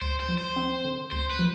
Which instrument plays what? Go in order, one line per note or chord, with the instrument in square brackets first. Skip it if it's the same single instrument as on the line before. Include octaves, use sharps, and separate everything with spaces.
[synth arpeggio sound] D2 [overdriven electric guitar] C5
[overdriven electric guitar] C5
[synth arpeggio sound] F3
[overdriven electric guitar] C5
[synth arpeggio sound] C4
D3
[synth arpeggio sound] D2 [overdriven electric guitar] C5
[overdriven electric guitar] B4
[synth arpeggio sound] F3